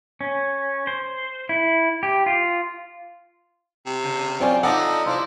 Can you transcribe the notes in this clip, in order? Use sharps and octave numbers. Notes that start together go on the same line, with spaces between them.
C#4
C5
E4
G4
F4
C3
C#3
F#3 C4 C#4 F4 D5 G5 G#5
F3 D#4 A4 D5 D#5 F#5 A#5
C3 E4 F4 C5 D5